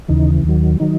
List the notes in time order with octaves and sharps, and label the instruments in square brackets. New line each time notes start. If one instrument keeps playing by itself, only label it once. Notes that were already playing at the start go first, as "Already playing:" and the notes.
[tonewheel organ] D#2 C#3 E3 D#4
D#2 D#3 F#3
D#3 F#3 D#4